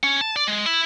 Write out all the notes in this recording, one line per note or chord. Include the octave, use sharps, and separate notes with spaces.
C#4
A5
D5
G#3
E4